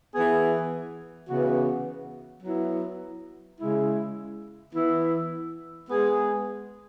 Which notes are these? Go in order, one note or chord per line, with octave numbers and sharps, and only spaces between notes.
E3 B3 G#4
C#3 E3 B3 F#4
F#3 B3 E4
C#3 G#3 E4
E3 B3 E4
G#3 B3 G#4